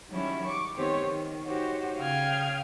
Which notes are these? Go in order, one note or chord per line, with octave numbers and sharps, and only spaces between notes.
D#3 F#3 G3 C#4 E4
C#6 D6
D#3 B3 C4 G4 C5 C#5
D#3
D#4 F#4 G4 C5 C#5
C#3 F5 G5 D#6 F6 G#6